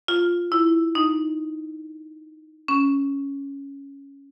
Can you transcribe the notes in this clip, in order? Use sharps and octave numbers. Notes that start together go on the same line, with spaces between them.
F4
E4
D#4
C#4